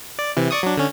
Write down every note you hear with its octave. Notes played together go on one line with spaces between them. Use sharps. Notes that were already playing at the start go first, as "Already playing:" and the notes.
D5
C3 E3
D5 C#6 D#6
F#3 D4
D3 C#4